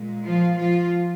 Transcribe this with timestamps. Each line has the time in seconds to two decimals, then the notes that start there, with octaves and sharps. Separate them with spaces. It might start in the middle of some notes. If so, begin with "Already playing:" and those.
Already playing: A#2 G#3
0.25 F3 F4
0.59 F3 F4